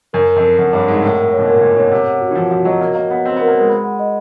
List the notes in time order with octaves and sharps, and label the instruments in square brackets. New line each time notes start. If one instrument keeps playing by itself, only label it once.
[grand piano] F#2 [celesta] A#4
[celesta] A#4
[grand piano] F2
[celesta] A#4
[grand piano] F#2 [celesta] F#5
[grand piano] G2 [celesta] C#5
[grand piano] G#2 [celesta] F#5
[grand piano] A2 [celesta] A#4
[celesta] A#4
C#5
[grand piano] B2
[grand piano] A#2 [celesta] A#4
[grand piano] A#2 [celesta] A#4
[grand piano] B2 [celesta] C#5
[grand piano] C3 [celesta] F#5
[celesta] F#5
F#4
[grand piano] E3
[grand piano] F3 [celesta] F#5
[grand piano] F3 [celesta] F#4
[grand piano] F#3 [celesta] D#5
[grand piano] A#3 [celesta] D#5
[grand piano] A#3 [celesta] D#5
[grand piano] B3 [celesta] F#5
[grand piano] C4 [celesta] D#5
[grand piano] B3 [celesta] A#4
[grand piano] A#3
[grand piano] G#3 [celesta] A#4
[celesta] B5
F#5
D#5